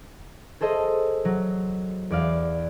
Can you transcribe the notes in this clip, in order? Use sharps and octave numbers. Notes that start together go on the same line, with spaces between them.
G#4 A4 C5 D#5
F#3
E2 D5 F5